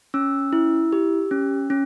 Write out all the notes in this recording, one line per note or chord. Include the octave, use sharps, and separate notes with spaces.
C#4 E6
E4
G4
C#4
C#4